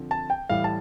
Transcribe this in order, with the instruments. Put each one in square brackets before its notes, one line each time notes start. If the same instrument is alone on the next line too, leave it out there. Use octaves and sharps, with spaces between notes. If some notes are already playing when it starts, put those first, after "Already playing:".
Already playing: [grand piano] D3 F3 C4
A5
G5
A2 E3 G3 F5
A5